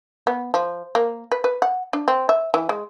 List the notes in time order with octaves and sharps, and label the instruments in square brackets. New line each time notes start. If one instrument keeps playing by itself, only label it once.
[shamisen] B3
F3
A#3
B4
B4
F#5
D4
C4
E5
E3
G#3